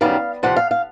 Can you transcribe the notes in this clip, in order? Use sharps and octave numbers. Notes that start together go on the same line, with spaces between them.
F#2 D#3 G3 B3 F5
F2 C3 F3 F#5
F5
F5